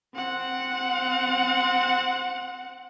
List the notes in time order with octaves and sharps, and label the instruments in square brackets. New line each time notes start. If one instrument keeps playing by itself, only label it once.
[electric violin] C4 F#5